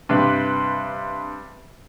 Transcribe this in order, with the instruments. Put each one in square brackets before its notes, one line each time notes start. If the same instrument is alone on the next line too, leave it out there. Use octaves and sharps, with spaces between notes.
[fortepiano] G2 C3 B4